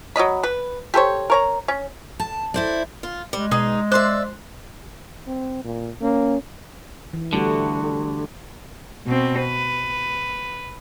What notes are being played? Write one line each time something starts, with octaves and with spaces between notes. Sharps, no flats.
F#3 C#4 D#5 B5
B4
G4 A4 C5 C#5
A#4 C#5 A#5
C#4
A5
E4 C5 D5
F4
G3 G#3
B2 D#4 G#4
C5 D5 E5 C6 F#6
C4
A#2
A#3 C#4
E3
D3 G3 A3 F#4
B2 C4
B4